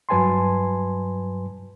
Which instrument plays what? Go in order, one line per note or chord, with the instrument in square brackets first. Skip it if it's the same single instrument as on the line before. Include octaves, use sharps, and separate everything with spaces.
[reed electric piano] G2 F#3 B4 G#5 A5 C6